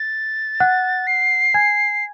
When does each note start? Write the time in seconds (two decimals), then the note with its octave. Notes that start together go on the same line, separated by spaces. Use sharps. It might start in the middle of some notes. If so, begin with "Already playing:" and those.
Already playing: A6
0.60 F#5 F#6
1.07 C7
1.54 G#5 G#6